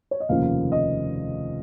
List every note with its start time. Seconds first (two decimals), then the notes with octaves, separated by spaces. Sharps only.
0.11 C#5
0.20 D#5
0.29 F1 D#2 C#3 F3 F5
0.72 D#5